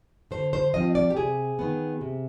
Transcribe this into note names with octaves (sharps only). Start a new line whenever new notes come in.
D3 C5
C5
F3 C4 F4 D#5
D5
G4
C3 G#4
D#3 B3
C3